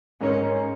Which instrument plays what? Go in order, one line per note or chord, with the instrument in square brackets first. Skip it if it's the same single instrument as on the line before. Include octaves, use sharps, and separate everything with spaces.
[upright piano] G#2 G#3 D#4 A#4 C#5 [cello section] C#4